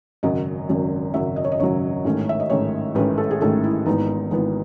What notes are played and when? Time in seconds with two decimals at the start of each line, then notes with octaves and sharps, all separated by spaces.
0.23 G#1 F#2 C#3 F#3 D#5
0.69 G#1 F#2 C#3 F#3
1.14 G#1 F#2 C#3 F#3 E5
1.36 D#5
1.45 C#5
1.52 D#5
1.60 G#1 F#2 C#3 F#3 C#5
2.04 A1 G#2 D#3 A3 C#4
2.29 E5
2.40 D#5
2.50 A1 G#2 D#3 A3 C#4 C#5
2.95 A1 G#2 D#3 A3 C#4 B4
3.18 A4
3.31 G#4
3.41 A1 G#2 D#3 A3 C#4 A4
3.64 E4
3.86 G#1 G#2 E3 B3 D#4
4.31 G#1 G#2 E3 B3